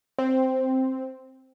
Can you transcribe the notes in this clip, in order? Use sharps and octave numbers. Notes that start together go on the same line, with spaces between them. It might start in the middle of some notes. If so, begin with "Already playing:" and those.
C4